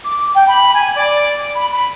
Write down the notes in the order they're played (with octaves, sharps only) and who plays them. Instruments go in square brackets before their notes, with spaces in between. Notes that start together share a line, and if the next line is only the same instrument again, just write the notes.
[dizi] D6
G5
B5
G#5
D5
B5
B5